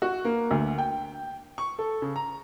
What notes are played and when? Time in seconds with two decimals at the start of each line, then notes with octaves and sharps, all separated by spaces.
0.02 F#4
0.25 A#3
0.51 D2
0.78 G5
1.58 C#6
1.79 A4
2.02 C#3
2.16 A#5